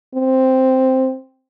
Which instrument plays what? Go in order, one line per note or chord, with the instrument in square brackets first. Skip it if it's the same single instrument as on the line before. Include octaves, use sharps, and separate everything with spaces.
[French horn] C4